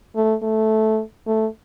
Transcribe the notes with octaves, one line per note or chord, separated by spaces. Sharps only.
A3
A3
A3